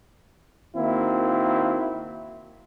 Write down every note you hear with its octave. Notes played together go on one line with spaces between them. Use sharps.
D#3 A#3 C4 E4 F#4